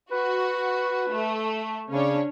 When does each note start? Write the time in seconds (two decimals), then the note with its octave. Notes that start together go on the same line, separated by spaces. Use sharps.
0.11 F#4 B4
1.12 A3
1.91 C#3 C#4 D4 C#5